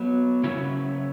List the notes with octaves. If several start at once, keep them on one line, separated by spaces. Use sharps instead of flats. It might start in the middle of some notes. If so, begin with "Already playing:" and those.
Already playing: F#3 B3 F#4
C#3 F#3 C#4 E4